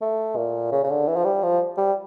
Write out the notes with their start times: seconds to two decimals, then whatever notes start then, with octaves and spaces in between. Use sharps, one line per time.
0.02 A3
0.36 A#2
0.72 C#3
0.84 C#3
0.90 D3
1.08 E3
1.16 F3
1.24 G3
1.43 F3
1.77 G3